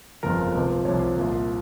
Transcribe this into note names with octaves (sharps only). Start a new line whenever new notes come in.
G1 F2 C#3 F3 A#4
C#2 C3 F3
C2 C3 F3 C#5
C2 A#2 F3